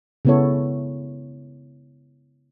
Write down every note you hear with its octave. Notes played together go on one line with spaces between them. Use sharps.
C#3 G#3 B3 E4 A4 C#5